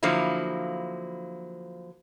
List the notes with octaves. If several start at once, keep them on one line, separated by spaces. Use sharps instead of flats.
D3 F3 F#3 A#3 E4